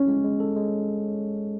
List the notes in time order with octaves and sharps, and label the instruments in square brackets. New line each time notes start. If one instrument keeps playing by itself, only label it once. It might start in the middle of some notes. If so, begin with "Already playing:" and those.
Already playing: [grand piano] C#4
[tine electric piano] G#3
G#3
A4
G#3